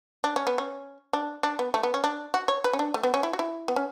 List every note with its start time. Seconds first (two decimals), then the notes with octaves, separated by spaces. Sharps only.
0.24 D4
0.36 C#4
0.47 B3
0.58 C#4
1.13 D4
1.43 D4
1.59 B3
1.74 A3
1.83 B3
1.94 C#4
2.04 D4
2.34 F#4
2.48 C#5
2.64 B4
2.73 C#4
2.79 D4
2.94 A3
3.03 B3
3.14 C#4
3.23 E4
3.33 F#4
3.39 E4
3.68 B3
3.76 C#4